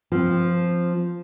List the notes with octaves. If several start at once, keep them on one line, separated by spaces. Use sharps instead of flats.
F3 C4